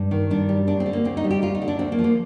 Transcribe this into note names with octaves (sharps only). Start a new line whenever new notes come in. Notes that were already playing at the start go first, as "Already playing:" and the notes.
Already playing: G2
D#3
G2 D4
G3
D2 D4
C4
D3
A#3
D2 C4
D#4
G3
G4
D2 F4
D#4
D3
D4
D2 C4
A#3
F3
A#3